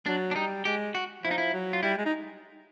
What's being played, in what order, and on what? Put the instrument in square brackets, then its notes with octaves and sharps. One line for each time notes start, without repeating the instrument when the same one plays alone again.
[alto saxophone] F#3 [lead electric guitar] D4
[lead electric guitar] D4
[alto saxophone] G3 [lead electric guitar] D#4
[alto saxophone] G#3 [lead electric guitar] G4
[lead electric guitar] F#4
[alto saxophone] F3 [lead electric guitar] E4
[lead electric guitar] D#4
E4
[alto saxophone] F#3
[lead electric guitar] F4
[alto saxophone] G3 [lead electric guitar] E4
[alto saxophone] G#3
D#4